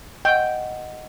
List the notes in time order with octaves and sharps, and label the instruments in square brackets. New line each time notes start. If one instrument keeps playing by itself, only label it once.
[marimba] D#5 F#5 [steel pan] G5